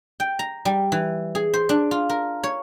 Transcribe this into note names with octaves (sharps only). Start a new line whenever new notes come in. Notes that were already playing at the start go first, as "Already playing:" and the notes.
G5
A#5
G3
E3
G#4
C5
D4
F4
A#4
C#5